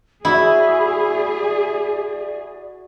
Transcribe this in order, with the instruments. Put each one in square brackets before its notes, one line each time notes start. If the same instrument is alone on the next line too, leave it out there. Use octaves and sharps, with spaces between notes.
[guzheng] E4 [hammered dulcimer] F#4 E5 [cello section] G#4 [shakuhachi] D5